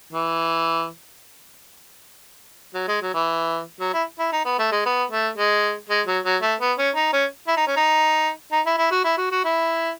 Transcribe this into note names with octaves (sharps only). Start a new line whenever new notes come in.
E3
F#3
G#3
F#3
E3
F#3
E4
E4
D#4
B3
A3
G#3
B3
A3
G#3
G#3
F#3
F#3
A3
B3
C#4
D#4
C#4
E4
D#4
C#4
D#4
D#4
E4
E4
F#4
E4
F#4
F#4
E4